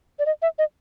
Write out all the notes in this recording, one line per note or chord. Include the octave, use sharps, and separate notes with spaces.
D5
D#5
E5
D#5